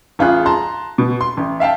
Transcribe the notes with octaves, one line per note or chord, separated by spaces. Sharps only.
A1 F4 G#4 F#6
A5 A#5 C6
B2
C6
A1
E5 F5 G5 A5